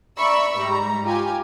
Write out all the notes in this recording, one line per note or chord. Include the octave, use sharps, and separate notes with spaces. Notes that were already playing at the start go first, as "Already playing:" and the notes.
D5 E5 A#5 B5 C#6 E6
G#2 G3 A#5
F4 G4 G#5